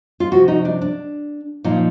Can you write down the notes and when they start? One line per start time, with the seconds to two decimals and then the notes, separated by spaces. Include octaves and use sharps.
0.20 F4
0.31 C3 F3 F#4
0.48 D#4
0.65 D4
0.81 D4
1.64 A#2 F3 D#4